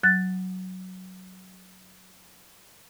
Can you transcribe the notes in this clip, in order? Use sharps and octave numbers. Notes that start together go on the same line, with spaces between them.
F#3 F#6 A6